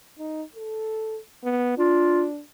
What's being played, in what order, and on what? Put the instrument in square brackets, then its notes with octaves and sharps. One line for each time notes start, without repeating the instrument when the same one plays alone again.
[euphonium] D#4
A4
B3
[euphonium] D4 [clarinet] F4